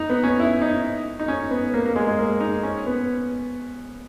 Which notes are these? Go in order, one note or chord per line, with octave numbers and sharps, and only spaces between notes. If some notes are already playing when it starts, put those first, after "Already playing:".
Already playing: D#4
B3
C#4
E4
D#4
D#4
C#4
B3
A#3
A#3
G#3
G#3
A#3
D#4
C#4
B3